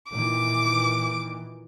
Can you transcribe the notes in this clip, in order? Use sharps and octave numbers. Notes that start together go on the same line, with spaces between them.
A#2 D#3 E3 D6